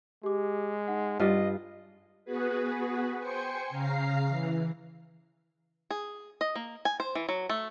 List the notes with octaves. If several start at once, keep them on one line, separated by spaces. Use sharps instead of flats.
G#3 G4 D6
D#4 F#5
G2 F4 D#5
B3 F#4 G#4 B4
C5 G5 G#5 C#7
C#3 F5 A#5 C7
E3
G#4
D#5
A#3
G#5
C5
E3
F#3
A3